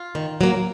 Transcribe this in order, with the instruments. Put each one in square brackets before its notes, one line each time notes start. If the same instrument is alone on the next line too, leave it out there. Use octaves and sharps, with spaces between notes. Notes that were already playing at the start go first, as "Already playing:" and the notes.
Already playing: [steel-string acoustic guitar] F4
D#3
F#3 A#3